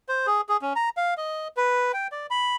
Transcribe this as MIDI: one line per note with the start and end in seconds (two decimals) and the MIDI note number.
0.09 0.26 72
0.27 0.41 68
0.49 0.57 68
0.62 0.73 61
0.76 0.89 82
0.97 1.14 77
1.17 1.48 75
1.57 1.92 71
1.94 2.07 79
2.12 2.27 74
2.30 2.56 83